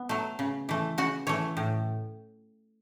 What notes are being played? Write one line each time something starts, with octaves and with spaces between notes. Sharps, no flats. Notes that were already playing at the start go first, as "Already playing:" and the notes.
Already playing: B3
F#3 A3
C#3
E3 A3
C#3 F#4
E3 A3 C#5
A2